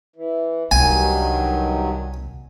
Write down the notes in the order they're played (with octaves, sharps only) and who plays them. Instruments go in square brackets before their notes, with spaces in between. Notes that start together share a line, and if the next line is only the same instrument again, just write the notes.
[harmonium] E3
[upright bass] C2 [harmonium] G2 D#3 F#3 [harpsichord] G#5